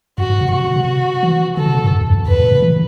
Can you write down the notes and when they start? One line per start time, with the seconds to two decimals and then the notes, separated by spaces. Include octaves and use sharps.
0.18 F#2 F#4
0.30 G2
0.41 C3
0.53 B2 F#4
0.65 B2
0.76 C3
1.23 E3
1.57 D3 A4
1.66 C3
1.75 B2
1.84 G2
1.92 F#2
2.01 E2
2.10 F#2
2.19 E2
2.27 F#2 B4
2.40 A2
2.51 C3
2.62 E3